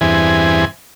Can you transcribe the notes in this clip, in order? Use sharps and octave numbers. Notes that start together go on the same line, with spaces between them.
E2 G2 E3 C4 G#4 G#5